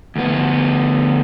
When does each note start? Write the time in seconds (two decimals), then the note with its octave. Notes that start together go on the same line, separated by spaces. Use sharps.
0.16 D2 B3